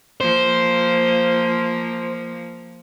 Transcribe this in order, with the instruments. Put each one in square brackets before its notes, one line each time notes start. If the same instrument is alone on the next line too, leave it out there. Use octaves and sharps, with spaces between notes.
[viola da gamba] F3 A#3 [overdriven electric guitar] C5